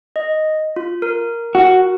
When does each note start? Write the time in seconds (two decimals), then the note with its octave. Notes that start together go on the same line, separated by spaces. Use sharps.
0.16 D#5
0.76 F4
1.02 A#4
1.55 F#4